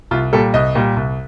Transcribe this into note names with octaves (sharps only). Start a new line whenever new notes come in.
C2 F4
A#2 G3 A4
C2 D#5
A#2 G3
C2